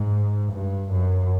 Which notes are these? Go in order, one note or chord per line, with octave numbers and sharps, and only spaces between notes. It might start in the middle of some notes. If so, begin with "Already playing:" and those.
Already playing: G#2
G2
F#2